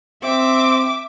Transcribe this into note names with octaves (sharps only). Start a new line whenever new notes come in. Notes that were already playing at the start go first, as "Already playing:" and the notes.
C4 E5 D6